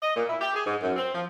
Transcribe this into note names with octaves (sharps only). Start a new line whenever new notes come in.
D#5
A#2
E4
G4
G#4
G#2
F#2
C4
F3